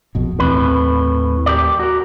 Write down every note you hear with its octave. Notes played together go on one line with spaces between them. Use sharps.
A#1 F2 B2
D#2 A2 E3 C4 B4
G4 A#4 D5
F#4 A#4